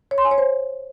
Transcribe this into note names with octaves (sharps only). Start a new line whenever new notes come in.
C#5
C6
G#5
C#5
C5